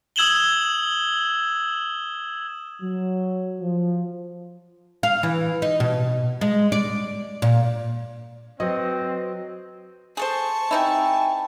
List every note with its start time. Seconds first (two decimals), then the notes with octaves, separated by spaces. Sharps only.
0.16 D#6 E6 G#6 E7 F#7 G7
2.81 F#3
3.60 F3
5.03 F5
5.23 E3
5.62 D#4
5.80 B2
6.41 G#3
6.72 D5
7.42 A#2
8.60 F#3 C4 B4 D#5
10.17 G#4 A4 C5 A5 C#6
10.71 C3 D#4 E4 G5 G#5